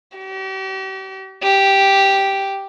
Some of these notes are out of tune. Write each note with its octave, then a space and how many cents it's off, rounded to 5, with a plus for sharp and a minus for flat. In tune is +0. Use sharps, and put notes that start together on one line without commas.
G4 -40
G4 -5